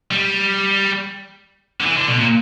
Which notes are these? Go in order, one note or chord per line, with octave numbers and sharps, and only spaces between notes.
G3
D3
E3
D3
B2
A#2